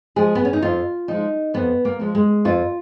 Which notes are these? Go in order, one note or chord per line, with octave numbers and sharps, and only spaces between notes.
F3 G#3 G#4
B3
C#4
D#4
F2 F4
F3 G#3 D#4
F2 B3
A#3
F3 G#3
G#3
F2 F4